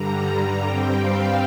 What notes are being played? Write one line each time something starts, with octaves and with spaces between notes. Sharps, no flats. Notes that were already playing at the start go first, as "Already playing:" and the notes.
Already playing: G2 D3 G3 A#5
G2 G3 C4 G5
F5